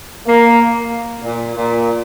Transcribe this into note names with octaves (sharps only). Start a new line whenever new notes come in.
A#3
A#2
A#2